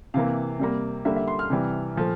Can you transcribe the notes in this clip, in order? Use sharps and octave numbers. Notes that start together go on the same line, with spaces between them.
C3 E3 A#3 F5
C3 G3 A#3
D3 G3 A#3 E5
E5
C6
F6
C3 E3 G3
A#2 F3 A3